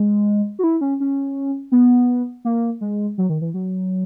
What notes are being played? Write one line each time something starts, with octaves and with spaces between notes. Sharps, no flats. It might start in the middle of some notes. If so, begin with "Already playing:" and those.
Already playing: G#3
F#4
E4
C#4
C#4
B3
A#3
G#3
F#3
D#3
E3
F#3